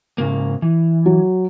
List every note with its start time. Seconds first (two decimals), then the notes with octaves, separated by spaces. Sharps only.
0.18 G#2 C#3 A#3
0.62 E3
1.06 F#3